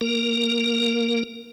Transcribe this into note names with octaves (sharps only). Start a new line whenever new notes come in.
A#3 A#4